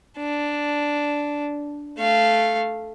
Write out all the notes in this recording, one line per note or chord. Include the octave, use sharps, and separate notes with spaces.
D4
A3 F5